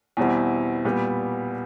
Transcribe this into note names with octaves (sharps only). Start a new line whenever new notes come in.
E2 B2 G3 C4 E4
A#2 G3 B3